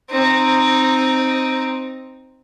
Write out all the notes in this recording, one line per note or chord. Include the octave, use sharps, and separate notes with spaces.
C4 D#4